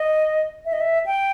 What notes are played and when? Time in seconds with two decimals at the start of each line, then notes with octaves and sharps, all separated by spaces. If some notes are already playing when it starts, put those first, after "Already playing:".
Already playing: D#5
0.65 E5
0.73 D#5
0.80 E5
1.06 G5